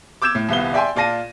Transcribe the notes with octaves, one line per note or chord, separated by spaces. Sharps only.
D6 E6 G6 G#6 E7
A2
D#1 C2 B3 G7
D5 E5 G5 G#5 C6
A#2 F4 D5 A5 A#6 D#7